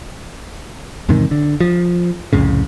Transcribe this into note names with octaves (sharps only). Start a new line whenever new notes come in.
E2 G#2 C3 D#3
D3
F3
C2 F2 A2 C#3